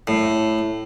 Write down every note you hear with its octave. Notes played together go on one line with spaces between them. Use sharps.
A2